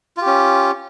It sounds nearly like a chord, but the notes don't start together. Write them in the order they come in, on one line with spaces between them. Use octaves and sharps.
F4 G4 C#4